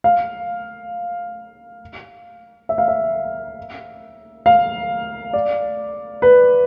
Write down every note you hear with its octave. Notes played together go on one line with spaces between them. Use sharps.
F5
E5
F5
E5
F5
D5
B4